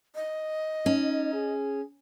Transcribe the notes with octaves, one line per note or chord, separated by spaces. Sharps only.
D#5
C#4 D#4
G#4